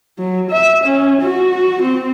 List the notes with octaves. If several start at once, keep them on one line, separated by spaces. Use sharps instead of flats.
F#3
E5
C#4
F#4
C4